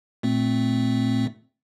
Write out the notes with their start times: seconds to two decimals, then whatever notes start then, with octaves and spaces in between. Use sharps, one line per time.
0.23 A#2 A3 C4